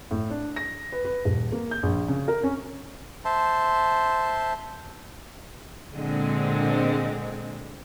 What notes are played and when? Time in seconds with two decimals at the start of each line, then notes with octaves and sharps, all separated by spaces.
0.11 A2
0.30 D4
0.56 A#6
0.92 B4
1.05 B4
1.25 D#1
1.52 A#3
1.71 G6
1.83 A#1
2.08 C#3
2.28 A#4
2.43 C#4
3.25 C5 E5 A5 C6
5.95 A#2 D3 G#3 C4